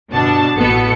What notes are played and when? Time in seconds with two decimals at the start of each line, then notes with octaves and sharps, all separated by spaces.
0.12 G1 B2 D4 A5
0.58 A1 B2 B3 A4 C#7